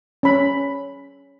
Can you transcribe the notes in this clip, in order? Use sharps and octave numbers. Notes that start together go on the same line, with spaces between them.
C#4 C5 B5